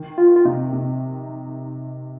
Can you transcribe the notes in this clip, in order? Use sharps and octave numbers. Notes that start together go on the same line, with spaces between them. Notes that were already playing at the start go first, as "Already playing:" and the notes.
Already playing: D#3
F4
F4
C3 D#4
C3